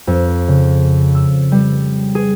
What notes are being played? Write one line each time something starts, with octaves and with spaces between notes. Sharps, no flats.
F2
C#3
E6
G3
G#4